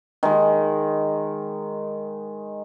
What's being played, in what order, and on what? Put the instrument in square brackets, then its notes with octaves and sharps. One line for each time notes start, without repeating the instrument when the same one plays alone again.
[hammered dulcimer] D#3 G#3